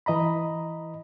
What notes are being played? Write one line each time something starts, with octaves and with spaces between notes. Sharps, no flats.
E3 D#5 A#5 B5